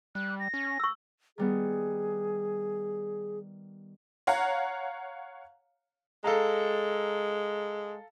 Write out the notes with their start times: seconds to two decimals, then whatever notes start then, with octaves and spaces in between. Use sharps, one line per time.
0.15 G3 F#6
0.40 A#6
0.54 C#4
0.80 C#6 E6
1.38 D#3 G3 B3 G#4
4.27 C#5 F5 F#5 A#5
6.24 G#3 A4 F5 A#5